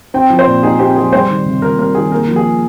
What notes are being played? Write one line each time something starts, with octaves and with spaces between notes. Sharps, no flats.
C4 G5
F3
C5
A#2
D#4 G#4
C4 G4
F3 G#4
G3 C5
D#3
C3
C3 A#4
G3 A#4
D#3 G#4
A#3 A#4
F3
G#4